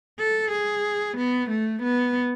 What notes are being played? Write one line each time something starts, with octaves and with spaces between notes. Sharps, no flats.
A4
G#4
B3
A3
B3